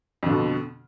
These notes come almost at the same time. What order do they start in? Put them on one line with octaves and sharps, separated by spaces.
F2 D3 B2